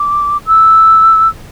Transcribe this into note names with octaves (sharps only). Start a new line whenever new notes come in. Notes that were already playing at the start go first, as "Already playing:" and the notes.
Already playing: D6
E6